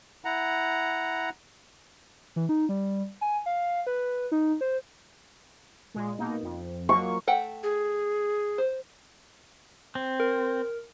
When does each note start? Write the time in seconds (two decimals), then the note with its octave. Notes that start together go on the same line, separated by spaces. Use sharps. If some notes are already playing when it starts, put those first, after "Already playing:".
0.25 E4 F#5 A#5
2.36 E3
2.49 D#4
2.69 G3
3.21 G#5
3.46 F5
3.87 B4
4.32 D#4
4.61 C5
5.94 A#2 G#3
6.19 B2 A#3 D#4
6.43 F2
6.89 F3 F#3 A#3 C#6
7.27 A3 F#5 G5
7.63 G#4
8.58 C5
9.95 C4
10.20 A#4